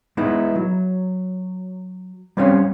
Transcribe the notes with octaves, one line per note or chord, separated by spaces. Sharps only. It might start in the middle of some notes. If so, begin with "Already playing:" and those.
G#3 B3 D#4 E4
F#3
G3 C4 C#4 G4 C#5 F5